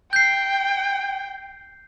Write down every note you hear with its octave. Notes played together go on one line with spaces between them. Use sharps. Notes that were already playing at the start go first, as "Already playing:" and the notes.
G5 G6 C7